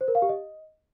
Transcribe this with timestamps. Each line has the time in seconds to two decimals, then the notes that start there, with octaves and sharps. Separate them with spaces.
0.01 C5
0.08 A#4
0.15 F5
0.22 G4
0.29 D#5